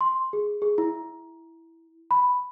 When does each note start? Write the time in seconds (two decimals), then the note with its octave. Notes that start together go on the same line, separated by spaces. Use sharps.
0.01 C6
0.33 G#4
0.62 G#4
0.78 E4
2.11 B5